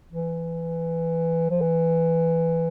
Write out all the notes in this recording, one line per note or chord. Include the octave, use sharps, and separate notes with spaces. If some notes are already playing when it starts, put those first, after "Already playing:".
E3
F3
E3